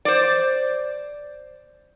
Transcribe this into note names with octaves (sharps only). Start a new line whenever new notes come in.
C5 D5